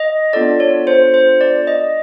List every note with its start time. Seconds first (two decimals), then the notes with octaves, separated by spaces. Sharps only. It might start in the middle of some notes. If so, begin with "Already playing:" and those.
Already playing: D#5
0.33 B3 D4 F4 A4 D5
0.60 C#5
0.87 C5
1.14 C5
1.41 D5
1.67 D#5